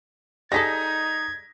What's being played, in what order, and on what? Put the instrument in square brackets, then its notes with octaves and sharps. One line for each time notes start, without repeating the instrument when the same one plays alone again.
[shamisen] G3 G#4 A4 [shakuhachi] D#4 [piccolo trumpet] G#6 [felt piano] A#6 B6